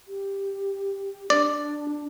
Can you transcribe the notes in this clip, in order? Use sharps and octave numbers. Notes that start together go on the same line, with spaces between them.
G4
D4 D5